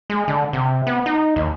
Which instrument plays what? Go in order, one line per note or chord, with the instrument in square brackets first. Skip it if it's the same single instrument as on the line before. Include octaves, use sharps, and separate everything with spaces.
[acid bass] G#3
D3
C3
B3
D#4
D#2